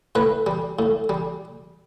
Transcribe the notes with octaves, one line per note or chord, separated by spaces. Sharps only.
A2 B4
G3
A2
G3